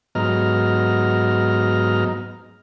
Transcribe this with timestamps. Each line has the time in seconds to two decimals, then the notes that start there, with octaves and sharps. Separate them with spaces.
0.15 G#2 F#3 B3 D#5 A#5 F6